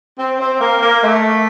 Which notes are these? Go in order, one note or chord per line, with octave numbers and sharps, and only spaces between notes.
C4
C4
A#3
A#3
A3